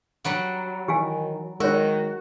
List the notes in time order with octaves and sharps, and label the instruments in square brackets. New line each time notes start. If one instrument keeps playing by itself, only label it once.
[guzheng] F#3 G3 F#5
[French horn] D#3 [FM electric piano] E3 [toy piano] G4 F5 G#5
[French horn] D#3 [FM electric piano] G#3 D#4 [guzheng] F#4 [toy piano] A#4 C#5